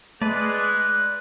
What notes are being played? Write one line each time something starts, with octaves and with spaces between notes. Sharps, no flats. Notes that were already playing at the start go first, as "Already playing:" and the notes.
G#3 A3 B4 D5 F#6